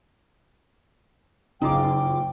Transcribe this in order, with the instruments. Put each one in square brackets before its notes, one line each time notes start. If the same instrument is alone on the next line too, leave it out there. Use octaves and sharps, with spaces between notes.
[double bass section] F#1 [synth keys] C#3 F4 D6 [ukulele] D#4 [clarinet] G5